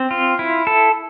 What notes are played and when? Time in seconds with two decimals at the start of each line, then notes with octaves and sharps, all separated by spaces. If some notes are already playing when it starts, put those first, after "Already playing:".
Already playing: C4
0.11 F4
0.39 E4
0.67 A4